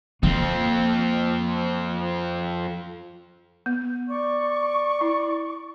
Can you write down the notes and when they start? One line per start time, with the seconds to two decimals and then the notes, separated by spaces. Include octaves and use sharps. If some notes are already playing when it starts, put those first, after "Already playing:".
0.23 F2 A#3 C4
3.66 B3
4.09 D5 C#6
5.01 E4